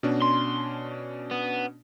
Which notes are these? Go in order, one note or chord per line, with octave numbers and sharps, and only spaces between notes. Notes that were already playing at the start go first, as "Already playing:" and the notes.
B2 C#4 D4
C6
B3